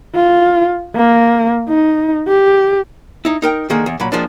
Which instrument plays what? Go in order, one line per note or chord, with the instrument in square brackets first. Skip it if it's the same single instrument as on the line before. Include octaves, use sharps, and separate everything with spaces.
[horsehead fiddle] F4
A#3
D#4
G4
[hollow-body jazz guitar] D#4 E4
D#4 A#4 G5
D3 D#3 G#3 A#3 G#4
E2
A#2 F#3 B5
F2 F3 G#3 A#3 D4